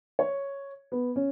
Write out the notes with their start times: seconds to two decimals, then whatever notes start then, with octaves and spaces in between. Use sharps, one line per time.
0.19 C#5
0.92 B3
1.16 C#4